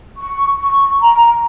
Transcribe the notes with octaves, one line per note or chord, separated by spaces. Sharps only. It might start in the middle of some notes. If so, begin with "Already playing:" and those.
C#6
C#6
A#5